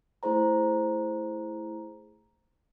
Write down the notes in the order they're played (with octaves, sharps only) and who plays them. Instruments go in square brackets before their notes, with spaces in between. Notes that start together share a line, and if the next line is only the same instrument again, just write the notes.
[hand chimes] A3 E4 G#4 C5 A#5